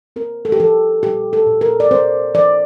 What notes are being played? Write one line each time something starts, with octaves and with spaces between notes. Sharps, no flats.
C4 A#4
A4
G4
F3 A4
A#2 G4
A4
A#2
A#4
D5
C4 C5
F3 D5